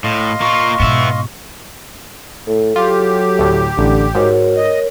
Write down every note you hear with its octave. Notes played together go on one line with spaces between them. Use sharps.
A2 D#5 F5 C6
A#3 F4 C#6
G#2 B2 B3 E5
A2 A4
F#3 F4 G4
D2 A2
A1 D3
G#2 F#4 A#4 C#5
D#5